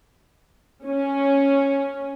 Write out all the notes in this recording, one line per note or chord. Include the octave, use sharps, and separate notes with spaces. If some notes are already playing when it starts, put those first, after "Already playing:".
C#4